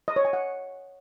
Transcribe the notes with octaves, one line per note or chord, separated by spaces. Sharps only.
D#5
C#5
G#5
F#5